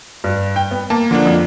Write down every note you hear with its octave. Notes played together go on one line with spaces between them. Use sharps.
G2
G5
B3
A#3 A5
D3 F3 A#3 D4
F2